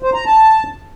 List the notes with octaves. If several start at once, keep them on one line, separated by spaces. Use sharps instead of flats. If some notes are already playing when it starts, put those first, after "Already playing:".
C5
A#5
A5